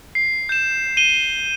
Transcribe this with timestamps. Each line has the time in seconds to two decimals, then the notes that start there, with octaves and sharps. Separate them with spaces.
0.15 C7
0.49 G6 E7
0.97 D#7 E7 G7